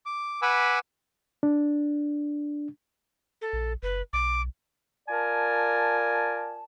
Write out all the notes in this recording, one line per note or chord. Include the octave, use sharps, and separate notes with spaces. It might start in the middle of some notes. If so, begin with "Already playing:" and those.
D6
B4 F#5 G#5 B5 D6 E6
D4
A4
A#1
F#1 B4
B1 D6
F4 A#4 D5 G#5 A5